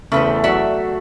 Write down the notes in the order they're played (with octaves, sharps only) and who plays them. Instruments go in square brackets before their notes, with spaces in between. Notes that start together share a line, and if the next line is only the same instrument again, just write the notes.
[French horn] E2 [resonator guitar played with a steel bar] C#3 B4 C5 [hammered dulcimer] A3
[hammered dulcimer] F#3 [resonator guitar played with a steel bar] D5 E5 F#5